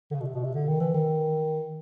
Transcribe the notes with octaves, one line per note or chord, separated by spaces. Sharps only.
D3
C#3
B2
C3
B2
C3
D3
D#3
E3
D#3